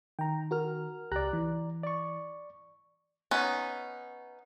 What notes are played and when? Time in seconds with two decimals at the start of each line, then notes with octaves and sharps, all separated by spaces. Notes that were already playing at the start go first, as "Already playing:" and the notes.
0.19 D#3 G5 A#5
0.51 F#4 A#4 F6
1.12 C#2 G4 D5 A#5 F#6
1.33 E3
1.84 D5 C#6
3.31 B3 C#4 D#4